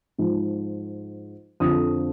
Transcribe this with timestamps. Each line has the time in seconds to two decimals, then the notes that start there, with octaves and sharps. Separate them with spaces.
0.18 G#2 F3
1.60 F2 D3 F3 D#6